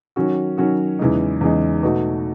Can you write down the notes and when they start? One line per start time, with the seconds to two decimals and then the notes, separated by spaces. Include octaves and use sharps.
0.16 D#3 F#3 C#4 F#4
0.57 D#3 F#3 C#4 F#4
0.99 E2 C#3 E3 G#3 D#4
1.41 E2 C#3 E3 G#3 D#4
1.83 B2 A3 D#4 F#4